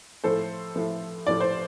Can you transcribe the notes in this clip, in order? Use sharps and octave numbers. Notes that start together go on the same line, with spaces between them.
A2 F3 A3 A4 C5
A2 F3 A3
A2 F3 A3 D5
C5